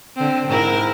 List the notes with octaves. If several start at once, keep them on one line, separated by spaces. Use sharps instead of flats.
D3 C4
G#2 E4 A#4